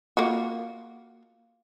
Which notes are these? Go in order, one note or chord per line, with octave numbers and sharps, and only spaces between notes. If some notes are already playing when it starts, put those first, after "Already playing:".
A#3 F4 F#4